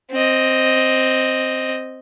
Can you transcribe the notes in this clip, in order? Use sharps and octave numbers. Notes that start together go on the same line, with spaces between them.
C4 D#5